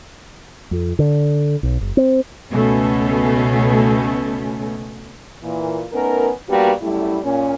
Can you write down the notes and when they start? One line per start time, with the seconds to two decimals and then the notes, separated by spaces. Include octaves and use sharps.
0.71 F2
0.99 D3
1.63 B1
1.81 F#1
1.97 C4
2.53 C#2 B2 A3 C#4
5.42 A#2 E3
5.92 A3 B3 C#4 D#4 A#4
6.49 G2 G3 A#3 B3 F#4 G4
6.81 F#2 G3 A3 E4
7.24 A#2 C#4